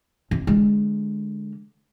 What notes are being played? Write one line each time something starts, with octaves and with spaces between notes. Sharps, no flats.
F2
D3 G#3